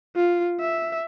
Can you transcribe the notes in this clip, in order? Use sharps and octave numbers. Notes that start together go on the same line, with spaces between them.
F4
E5